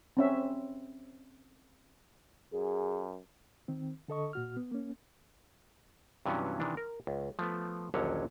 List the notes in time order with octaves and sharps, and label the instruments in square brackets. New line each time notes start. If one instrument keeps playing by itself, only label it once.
[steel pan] C4 C#4 E5
[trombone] F#2 [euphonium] G#4
[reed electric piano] D#3 C4
D3 A4 D#5 C#6
A#2 F#4 F6
B3
A#3 C#4
[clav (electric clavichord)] G2 C3 E3 F#3 B3 C#4
C3 D#3 E3 D4
A#4
C#2
F3 A3 B3
A#1 D#2 D3 F#3 C#4 C#5